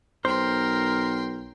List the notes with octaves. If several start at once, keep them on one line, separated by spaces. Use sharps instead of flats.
B1 A#4 C5 G5 C6